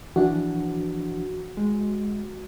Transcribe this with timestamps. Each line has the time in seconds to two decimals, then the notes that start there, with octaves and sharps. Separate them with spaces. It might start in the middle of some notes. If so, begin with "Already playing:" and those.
0.16 E3 F3 D4 F#4
1.57 G#3